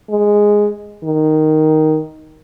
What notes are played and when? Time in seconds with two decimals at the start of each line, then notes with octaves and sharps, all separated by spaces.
0.10 G#3
1.04 D#3